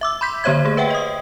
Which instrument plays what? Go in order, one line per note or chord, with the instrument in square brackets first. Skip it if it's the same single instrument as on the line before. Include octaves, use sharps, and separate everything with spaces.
[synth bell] E5 D6 E6
B5 C6 G6 B6
D3 A#3 C5 C#5 E5 G#6
A3 G#4
B4 E5 F#5 G5
D#5 D#6